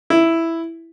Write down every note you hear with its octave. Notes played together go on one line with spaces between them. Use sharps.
E4